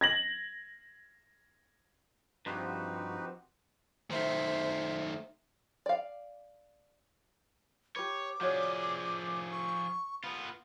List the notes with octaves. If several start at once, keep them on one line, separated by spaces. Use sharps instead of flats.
G#6 A#6 F#7
G2 F3 C4 D#4 F#4 G4 B4
D#3 A3 C5 E5
D5 F5
G4 B4 C#5 D6
F3 F#4 G#4 C#5 D5
C#6
B3 F4 B5